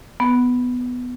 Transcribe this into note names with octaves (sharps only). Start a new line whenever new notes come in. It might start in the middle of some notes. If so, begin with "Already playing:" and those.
B3